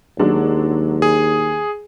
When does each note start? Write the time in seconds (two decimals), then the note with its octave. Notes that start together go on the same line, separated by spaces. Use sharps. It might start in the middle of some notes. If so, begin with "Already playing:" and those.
0.19 D#2 F#3 G#3 D4
1.02 G#4